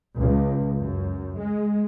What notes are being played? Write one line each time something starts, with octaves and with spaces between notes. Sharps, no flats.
C#2
F#2
G#3